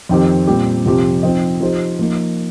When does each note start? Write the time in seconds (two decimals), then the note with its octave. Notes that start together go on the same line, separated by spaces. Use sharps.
0.09 F2 D#3 C4 G4
0.47 A#2 G3 C4 G4
0.85 F2 C3 F3 C4 G4
1.23 F3 C4 D#4 C5 D#5
1.61 F3 D#4 G4 C5
1.99 F3 A#3 D#4